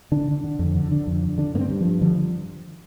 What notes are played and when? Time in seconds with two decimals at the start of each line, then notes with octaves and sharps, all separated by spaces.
0.12 D3 D4
0.28 D3
0.44 D3
0.59 F2
0.75 D3
0.91 D3
1.07 F2
1.23 D3
1.38 D3 D4
1.54 G2 A#3
1.59 C4
1.70 G2
1.81 G2 F3
2.01 D3 F3